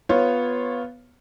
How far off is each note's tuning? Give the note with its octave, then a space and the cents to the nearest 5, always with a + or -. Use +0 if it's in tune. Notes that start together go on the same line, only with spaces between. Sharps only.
B3 +0 F4 +0 C#5 -15